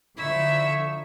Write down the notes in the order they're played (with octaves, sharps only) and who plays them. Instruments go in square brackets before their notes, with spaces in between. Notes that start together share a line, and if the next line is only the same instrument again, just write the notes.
[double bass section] D3 F3 [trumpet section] D#4 C#6 [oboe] E4 [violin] E5